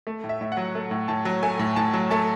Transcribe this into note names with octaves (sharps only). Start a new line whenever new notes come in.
A3
A2
E5
A2 E5
F#5
F#3
A3
A2
A2 A5
F#3
A3 G#5
A2
A2 A5
F#3
A3 A5